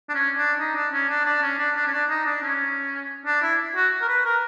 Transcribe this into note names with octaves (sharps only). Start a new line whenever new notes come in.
D4
C#4
D4
D#4
D4
C#4
D4
D4
C#4
D4
D4
C#4
D4
D#4
D4
C#4
D4
E4
F#4
A#4
B4
A#4